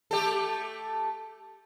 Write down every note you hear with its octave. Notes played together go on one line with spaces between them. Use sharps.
A3 G4 A4